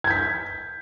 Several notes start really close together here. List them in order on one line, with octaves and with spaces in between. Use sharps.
G#6 G6 B6